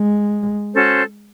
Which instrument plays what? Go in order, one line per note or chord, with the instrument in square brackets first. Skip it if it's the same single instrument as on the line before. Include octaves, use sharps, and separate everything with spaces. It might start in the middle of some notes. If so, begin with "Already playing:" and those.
Already playing: [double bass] G#3
[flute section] C#4 F#4 A4 C5